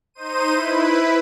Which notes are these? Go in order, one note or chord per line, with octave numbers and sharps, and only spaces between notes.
D#4 C5 D#7
E4 B4